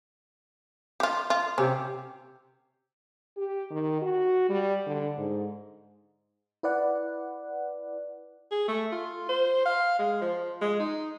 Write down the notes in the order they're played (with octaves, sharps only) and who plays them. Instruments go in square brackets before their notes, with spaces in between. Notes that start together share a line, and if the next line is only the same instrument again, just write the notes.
[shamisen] F4 G4
F4
[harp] C3 G4 [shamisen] C#4
[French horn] G4
D#3
F#4
G3
D3
G#2
[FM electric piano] E4 B4 D5 F#5
[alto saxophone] G#4
A3
F4
C5
F5
G#3
F3
G#3
D#4